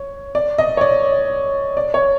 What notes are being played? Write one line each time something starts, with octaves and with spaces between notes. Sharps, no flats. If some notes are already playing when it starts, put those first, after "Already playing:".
Already playing: C#5
D5
D#5
C#5
D5
D5
C#5